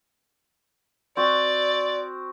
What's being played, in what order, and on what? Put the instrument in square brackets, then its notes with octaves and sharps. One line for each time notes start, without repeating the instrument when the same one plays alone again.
[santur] C4 F#4 [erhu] D5